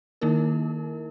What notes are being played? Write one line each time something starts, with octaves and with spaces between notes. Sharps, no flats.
D#3 A#3 D#4 E4 A#4